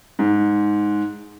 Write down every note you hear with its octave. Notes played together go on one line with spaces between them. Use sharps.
G#2